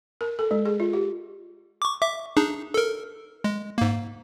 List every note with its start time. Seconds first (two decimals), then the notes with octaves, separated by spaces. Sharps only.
0.21 A#4
0.39 A4
0.51 G#3
0.65 G#4
0.80 F4
0.93 G4
1.82 C#6 D6
2.01 E5 D6
2.37 D4 D#4 G#4
2.74 A4 A#4
3.44 G#3
3.78 G#2 A#3